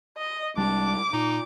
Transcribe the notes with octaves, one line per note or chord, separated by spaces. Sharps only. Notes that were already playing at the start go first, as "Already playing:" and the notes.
D#5
C2 G3 G#3 D4 D6
A#2 D#4